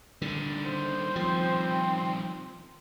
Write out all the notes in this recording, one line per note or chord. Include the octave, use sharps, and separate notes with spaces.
D3 D#3 G3
C5
F3 C4